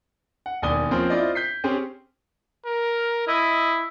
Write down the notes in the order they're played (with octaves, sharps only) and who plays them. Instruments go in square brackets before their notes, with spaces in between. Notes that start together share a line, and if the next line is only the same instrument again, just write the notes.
[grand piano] F#5
E1 D#2 D5 G#5 D#6 G7
F3 A#3 C4 C#4 A#4 C5
E4 F4 C5 D5 D#5
G6 B6 C7
C4 C#4 G4 G#4 C5
[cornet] A#4
[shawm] E4 [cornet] D#5